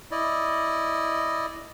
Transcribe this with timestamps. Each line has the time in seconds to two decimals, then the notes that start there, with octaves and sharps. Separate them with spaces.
0.11 E4 D5 D#5